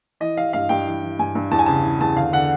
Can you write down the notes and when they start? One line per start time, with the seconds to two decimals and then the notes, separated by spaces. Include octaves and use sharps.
0.20 E3 D#5
0.37 E3 F5
0.53 G2 F5
0.69 G2 G5
0.86 E3
1.03 E3
1.19 G2 G#5
1.35 G2
1.51 E2 A5
1.59 G#5
1.66 C#3 A5
1.84 E3
2.00 E2 A5
2.17 D3 F5
2.33 D3 F#5